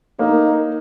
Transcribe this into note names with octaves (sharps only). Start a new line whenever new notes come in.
A#3 D#4